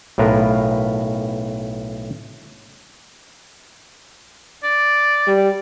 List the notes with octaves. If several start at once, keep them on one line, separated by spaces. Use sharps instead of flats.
B1 A2 F4 A#4 B4
D5
G3